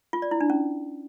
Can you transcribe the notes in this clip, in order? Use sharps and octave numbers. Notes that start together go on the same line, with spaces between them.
F4
D5
E4
D4
C#4